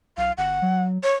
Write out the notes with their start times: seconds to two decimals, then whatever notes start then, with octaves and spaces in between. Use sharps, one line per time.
0.17 B1 F5
0.38 G1 F#5
0.62 F#3
1.03 C#5